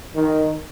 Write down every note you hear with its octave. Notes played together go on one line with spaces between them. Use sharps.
D#3